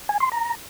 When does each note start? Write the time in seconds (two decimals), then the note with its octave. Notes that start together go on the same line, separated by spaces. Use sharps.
0.09 G#5
0.20 C6
0.32 A#5